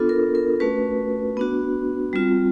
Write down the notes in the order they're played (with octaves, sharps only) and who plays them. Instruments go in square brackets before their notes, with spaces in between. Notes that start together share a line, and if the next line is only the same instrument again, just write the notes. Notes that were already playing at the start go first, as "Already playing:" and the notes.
Already playing: [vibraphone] B3 D4 F4 A4
A#4
A#4
A3 C#4 F#4 B4
B3 D4 F#4
G3 C4 F4